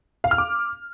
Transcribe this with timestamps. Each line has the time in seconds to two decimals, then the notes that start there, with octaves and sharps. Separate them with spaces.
0.24 F5
0.31 F6
0.38 D6